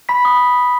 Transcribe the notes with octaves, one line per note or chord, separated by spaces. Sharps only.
B5 B6
D#6